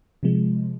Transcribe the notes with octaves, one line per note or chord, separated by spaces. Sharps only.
C3 F3 G#3